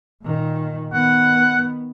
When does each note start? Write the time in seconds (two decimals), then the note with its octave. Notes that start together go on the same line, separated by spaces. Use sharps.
0.23 A#2 D#3
0.93 D#3 B3 F#5